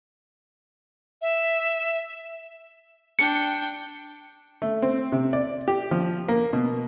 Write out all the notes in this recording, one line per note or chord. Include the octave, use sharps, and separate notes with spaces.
E5
D4 G5 C#7
A3
C4
C3
D5
G4
F3
A#3
B2